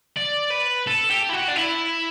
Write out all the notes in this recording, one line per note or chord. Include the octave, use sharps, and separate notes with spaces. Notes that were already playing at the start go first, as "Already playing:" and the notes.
D5
B4
A4
G4
E4
F#4
D4
E4